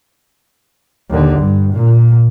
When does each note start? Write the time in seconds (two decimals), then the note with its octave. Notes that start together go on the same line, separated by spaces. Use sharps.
1.10 D#2 D3
1.39 G2
1.73 A#2